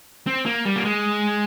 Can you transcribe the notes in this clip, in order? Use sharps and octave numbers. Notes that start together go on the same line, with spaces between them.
C4
A#3
G3
A#3
G#3